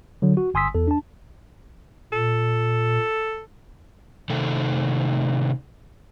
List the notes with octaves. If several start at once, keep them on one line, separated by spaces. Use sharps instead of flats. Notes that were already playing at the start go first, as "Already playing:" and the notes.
D3 F#3
F#4
G1 G#5 C6 D#6 E6 B6
E2 A4
D4 A5
A#2 A4
C3 D#3 A3 A4